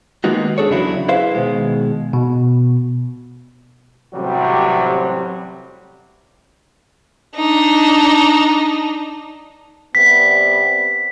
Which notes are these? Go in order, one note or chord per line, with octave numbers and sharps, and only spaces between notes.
D#3 G#3 A#3 B3 D#4 F#4
D4 G#4 A4 C#5
E2 C#3 F#3 D4 E4 F#4
E4 G#4 B4 C5 E5 F5
B2 D#3 G#3
B2
A1 C3 F#3 G3 F#4 G4
D4 D#4
C3 G3 B3 B6